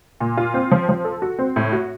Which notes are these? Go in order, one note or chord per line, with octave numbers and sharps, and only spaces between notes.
A#2
F4
C4
F3
F3
A4
F#4
C4
A2
F#4